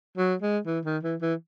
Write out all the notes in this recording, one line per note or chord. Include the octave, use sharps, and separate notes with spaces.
F#3
G#3
E3
D#3
E3
E3